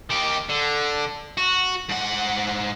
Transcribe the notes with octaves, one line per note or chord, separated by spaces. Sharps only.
D#3 G4
D3
F#4
G#2 F#5